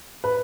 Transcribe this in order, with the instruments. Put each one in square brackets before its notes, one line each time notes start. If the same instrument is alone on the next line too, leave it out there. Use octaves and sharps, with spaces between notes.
[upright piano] B4